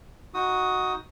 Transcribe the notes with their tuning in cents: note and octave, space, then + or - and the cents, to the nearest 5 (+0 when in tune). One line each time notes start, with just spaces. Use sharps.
D#4 +15 F#4 +0 D#6 +15